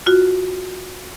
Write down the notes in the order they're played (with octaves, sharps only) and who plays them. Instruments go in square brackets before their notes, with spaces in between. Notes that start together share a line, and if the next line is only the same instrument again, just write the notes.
[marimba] F4 F#4